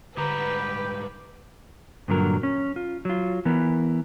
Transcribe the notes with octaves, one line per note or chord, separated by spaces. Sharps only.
G#2 D3 G3 G4 B4 A#5
G2 A#2 D3 F#3 A#4
C#4
F4
F#3 F4
E3 B3 A#4